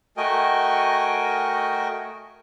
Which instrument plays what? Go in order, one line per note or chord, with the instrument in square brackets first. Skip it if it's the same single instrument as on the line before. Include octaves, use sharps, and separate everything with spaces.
[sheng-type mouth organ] A3 F#4 A#4 D#5 G5 G#5